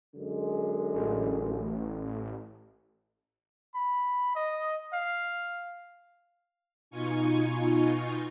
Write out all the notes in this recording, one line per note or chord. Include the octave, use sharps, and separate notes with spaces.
F#2 D3 G#3
A1
B5
D#5
F5
B2 D#4 F4 G#5 C#6